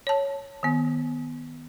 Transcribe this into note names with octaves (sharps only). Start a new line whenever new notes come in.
C#5 A5
D#3 B3